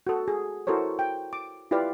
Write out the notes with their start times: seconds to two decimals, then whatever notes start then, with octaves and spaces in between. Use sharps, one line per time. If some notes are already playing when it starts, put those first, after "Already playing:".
0.07 F#4 A4
0.28 G#4
0.67 E4 F#4 A4 A#4 C5 C#5
0.99 G5
1.33 D6
1.71 E4 F4 G4 B4 D5 F5